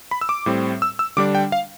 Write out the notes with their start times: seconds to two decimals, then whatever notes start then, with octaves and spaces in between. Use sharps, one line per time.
0.11 B5
0.21 E6
0.29 D6
0.46 A2 G3 C4
0.82 E6
0.99 E6
1.17 D3 G3 D4 D6
1.35 G5
1.52 F5